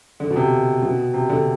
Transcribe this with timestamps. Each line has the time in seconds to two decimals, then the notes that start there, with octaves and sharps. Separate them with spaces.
0.20 D3
0.30 B2
0.36 C3
0.82 B2
1.13 C3
1.29 D3